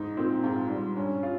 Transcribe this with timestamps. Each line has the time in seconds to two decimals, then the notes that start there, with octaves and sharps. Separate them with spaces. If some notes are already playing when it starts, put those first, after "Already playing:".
Already playing: G#2 D#4
0.17 A#2 C4
0.43 G#2 F4
0.69 G3
0.96 G2 C#4
1.23 F4